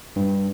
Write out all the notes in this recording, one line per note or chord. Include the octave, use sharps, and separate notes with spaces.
G2